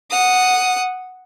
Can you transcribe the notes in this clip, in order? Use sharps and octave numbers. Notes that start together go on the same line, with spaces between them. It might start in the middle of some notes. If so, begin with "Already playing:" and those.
F#5 D#6